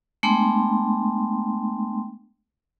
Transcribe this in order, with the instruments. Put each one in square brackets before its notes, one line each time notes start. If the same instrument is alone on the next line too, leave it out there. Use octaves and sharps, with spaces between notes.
[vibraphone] G#3 A3 B3 D4 G5 C6